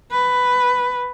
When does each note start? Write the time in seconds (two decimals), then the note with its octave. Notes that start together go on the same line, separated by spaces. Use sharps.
0.11 B4